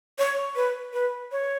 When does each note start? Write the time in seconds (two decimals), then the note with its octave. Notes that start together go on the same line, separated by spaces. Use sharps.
0.19 C#5
0.56 B4
0.93 B4
1.32 C#5